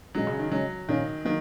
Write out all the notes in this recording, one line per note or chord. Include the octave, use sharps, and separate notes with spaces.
A#2 F#3 G#3 C#4
C#3
D#3
C#3 F#3 G#3 C#4
A#2 D#3 A#3 C#4
D#3 F#3 A#3